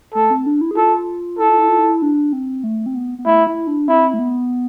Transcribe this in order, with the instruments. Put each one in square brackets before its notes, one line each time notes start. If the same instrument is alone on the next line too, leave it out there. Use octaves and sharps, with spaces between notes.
[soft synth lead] A3 [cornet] A4
[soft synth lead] C4
D4
E4
G#4
[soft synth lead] F4 [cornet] A4
[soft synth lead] E4 [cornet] A4
[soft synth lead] F4
E4
F4
E4
D4
C4
A3
C4
B3
B3
[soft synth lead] A3 [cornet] E4
[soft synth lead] E4
D4
[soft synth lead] C4 [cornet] E4
[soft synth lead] A3
B3